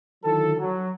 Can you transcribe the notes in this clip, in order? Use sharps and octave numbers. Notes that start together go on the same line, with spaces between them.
D3 D#3 F#3 E4 A4
F#3